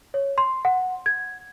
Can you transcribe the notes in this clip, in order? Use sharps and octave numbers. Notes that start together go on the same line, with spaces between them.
C#5
C6
F#5
G#6